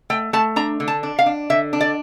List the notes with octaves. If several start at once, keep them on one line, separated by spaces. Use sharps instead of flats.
A3 G5
A3 A5
D4 A#5
D3
A5
D4
F5
D4
D3 E5
D4
D5